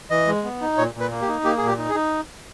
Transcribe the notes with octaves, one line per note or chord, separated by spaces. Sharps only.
E3 D#5
G#3
B3
D#4
A#2 C#5
A#2
B4
A#3
G4
D#4
A#3 G4
A#2 G#4
G4
D#4
G#4
D#4